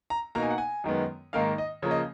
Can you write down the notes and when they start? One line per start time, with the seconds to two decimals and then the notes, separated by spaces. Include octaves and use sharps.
0.10 A#5
0.35 B2 A#3 D#4 A#5
0.43 G#5
0.50 F#5
0.58 G#5
0.84 F#2 D#3 G#3 B3
1.33 G#2 D#3 A#3 D#4 F5
1.58 D#5
1.82 C#3 F3 A#3 C#5
1.91 D#5